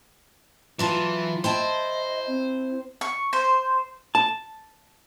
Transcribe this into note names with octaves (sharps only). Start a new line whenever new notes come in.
E3 F#3 E4 F4 A5
E4 C5 D#5 G5 A5
C4
C#6
C5
A5